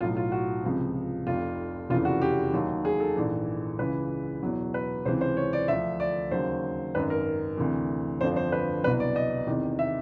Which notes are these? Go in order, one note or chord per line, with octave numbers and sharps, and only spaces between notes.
B1 A2 F#3 F4
F4
F#4
C#2 C3 F3
F1 F2 C3 F4
F1 E2 C#3 E3 F4
F#4
G4
D#2 D#3 F#3
G#4
A4
A#1 G#2 E3
C#2 C#3 E3 B4
E2 B2 F#3
B4
C#2 C3 E3 C5
C5
C#5
D5
D2 D3 F3 E5
D5
D#2 C#3 F#3 C5
G#1 F#2 D#3 B4
A#4
D2 C3 E3
G1 F2 D3 F3 C5
C5
B4
C2 B2 F#3 B4
D5
D#5
E2 C3 D#3
E5